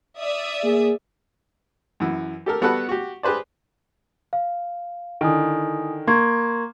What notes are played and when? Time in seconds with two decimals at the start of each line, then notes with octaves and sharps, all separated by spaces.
0.19 D5 E5 D#6
0.64 A#3 G#4
2.00 F#2 E3
2.46 G4 A4 A#4
2.61 G3 B3 F#4 A4 B4 F#5
2.89 F#4 G4
3.23 G4 G#4 B4 C5 D5
4.33 F5
5.21 D3 D#3 E4 G#5 D#6
6.07 A#3 C6 C#6 G#6